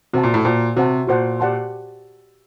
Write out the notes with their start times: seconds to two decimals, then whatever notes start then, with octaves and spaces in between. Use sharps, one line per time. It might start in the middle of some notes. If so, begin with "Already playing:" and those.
0.13 C3 F#4 C5 F#5 A5
0.23 A#2
0.34 A2
0.45 A#2 F#4 C5 F#5 A5
0.76 C3 F#4 C5 F#5 A5
1.08 A#2 F#4 C5 F#5 A5
1.40 G4 D5 F#5 A5 C6